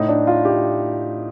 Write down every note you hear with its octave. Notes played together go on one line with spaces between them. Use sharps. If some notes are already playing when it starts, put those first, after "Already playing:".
Already playing: A2 D#4
D4
F4
G4